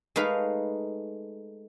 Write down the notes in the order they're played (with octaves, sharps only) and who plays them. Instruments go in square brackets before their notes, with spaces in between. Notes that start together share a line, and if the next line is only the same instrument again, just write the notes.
[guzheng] G#3 A3 D#4 B4 F5